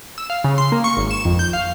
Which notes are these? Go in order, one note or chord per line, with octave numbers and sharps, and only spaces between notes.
E6
F5
C#3
C6
A#3
C#6
G#1
E7
F2
G6
F5